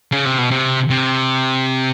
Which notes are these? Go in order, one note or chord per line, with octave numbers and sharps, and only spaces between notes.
C#3
C3
B2
C3
C3